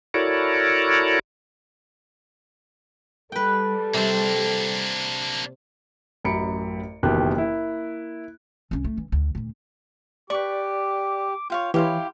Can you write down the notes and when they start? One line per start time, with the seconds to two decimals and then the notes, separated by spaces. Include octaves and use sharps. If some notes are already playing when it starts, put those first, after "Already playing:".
0.14 E4 F#4 A4 A#4 C#5 D5
3.32 G3 A4 B4 G5
3.94 C3 A#3 D4 C5
6.24 A1 F#2 B5 C#7 D7
7.03 F#1 B2 D#3 E3 G4 F#6
7.34 A#3 E4
8.71 C2 C#4
8.84 A3
8.98 E3
9.12 D2
9.35 D2 A#2
10.30 G4 B4 D5 C#6 D6
11.50 F4 C#5 F5 G5
11.74 E3 E4 G4 C#5 F5 C6